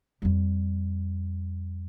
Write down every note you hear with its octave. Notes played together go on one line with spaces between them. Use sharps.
F2 G3